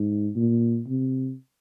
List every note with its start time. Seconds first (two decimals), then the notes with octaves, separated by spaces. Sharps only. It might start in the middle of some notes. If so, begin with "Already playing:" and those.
Already playing: G#2
0.36 A#2
0.87 C3